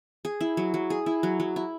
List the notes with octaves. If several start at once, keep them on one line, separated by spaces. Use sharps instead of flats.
G#4
E4
F#3
F#3
G#4
E4
F#3
F#3
E4